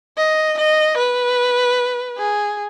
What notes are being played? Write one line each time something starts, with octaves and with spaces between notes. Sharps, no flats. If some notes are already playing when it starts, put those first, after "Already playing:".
D#5
D#5
B4
G#4